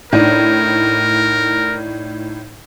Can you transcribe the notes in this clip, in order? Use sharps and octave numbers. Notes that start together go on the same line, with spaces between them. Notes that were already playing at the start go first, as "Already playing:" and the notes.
A2 D4 D#4 A#4